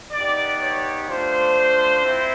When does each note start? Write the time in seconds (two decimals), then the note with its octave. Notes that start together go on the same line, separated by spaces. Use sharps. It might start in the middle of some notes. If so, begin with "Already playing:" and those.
0.11 B3 D#4 G4 D5
0.60 C#5
1.07 A3 D4 F4 C5
2.03 C4 E4